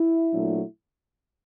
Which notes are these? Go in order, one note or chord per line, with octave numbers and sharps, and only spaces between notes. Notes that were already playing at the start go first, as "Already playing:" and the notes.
Already playing: E4
A#2 F#3 A3 D4